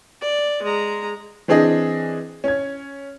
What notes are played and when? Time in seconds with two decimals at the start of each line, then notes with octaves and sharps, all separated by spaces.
0.21 D5
0.62 G#3 A#5
1.48 E3 C4 D4 G#4 D#5
2.44 C#4 G#6